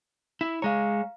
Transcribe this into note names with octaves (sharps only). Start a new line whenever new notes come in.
E4
G#3 C#5 F5 A#5